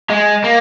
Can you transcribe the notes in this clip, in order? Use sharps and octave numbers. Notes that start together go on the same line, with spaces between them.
G#3
A#3